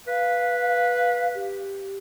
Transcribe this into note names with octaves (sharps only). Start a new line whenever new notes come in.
B4 F5
G4